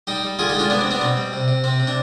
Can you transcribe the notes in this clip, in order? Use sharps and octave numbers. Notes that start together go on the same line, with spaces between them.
G3 D#4 G4
G3
D3 F4 G#4
D#4 G4
G#3
D4 F4
G3 B3 D4
C4
G3 B3 D4
B2 C4
G3
C3
C3
C3 C4
C3
D4